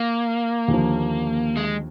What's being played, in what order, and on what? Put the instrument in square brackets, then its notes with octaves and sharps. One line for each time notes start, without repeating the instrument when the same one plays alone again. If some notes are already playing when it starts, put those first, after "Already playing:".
Already playing: [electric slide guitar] A#3
[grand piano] D#2 D3 F3
[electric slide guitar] G#3